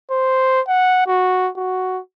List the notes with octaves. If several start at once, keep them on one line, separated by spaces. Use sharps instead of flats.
C5
F#5
F#4
F#4